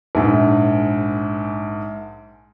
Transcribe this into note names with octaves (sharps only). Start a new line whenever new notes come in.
A#1 G#2